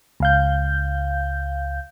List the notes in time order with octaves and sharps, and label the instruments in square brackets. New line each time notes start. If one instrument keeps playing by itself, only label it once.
[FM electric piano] C#2 F5 G6